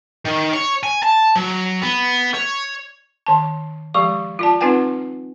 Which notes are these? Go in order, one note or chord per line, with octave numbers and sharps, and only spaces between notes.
D#3
C#5
G#5
A5
F#3
B3
C#5
D#3 A5
F3 G#3 G4 C#6
F4 D5 A5
C4 D#4 F4 B4 F#5 G#5